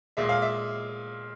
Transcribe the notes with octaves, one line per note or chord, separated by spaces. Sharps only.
A#2 G#3 E5
F5
E5